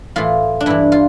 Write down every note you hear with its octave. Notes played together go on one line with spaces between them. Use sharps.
A2 E3 F4
D4
G2 E3 E4
F4